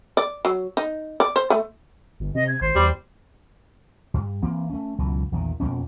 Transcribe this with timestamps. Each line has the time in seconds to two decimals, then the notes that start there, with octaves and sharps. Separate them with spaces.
0.17 D5
0.45 F#3
0.77 D#4
1.20 D5
1.36 C5
1.50 A3
2.20 G1
2.35 C3 D#5
2.48 G#6
2.61 G#1 C5
2.75 E2 G3
4.14 G2
4.42 E3 A#3 C4
4.70 A3 C#4
4.99 C#2 F#2 B2 E3
5.32 A#1 E2 D#3
5.60 F2 B2 A#3 C#4